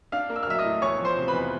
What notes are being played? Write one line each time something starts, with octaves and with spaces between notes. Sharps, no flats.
D4 F5 F6
A#3
E6
F6
F#3 E5 E6
D#5 D#6
A2
E2 C#5 C#6
F3
C5 C6
C3
B4 B5
E2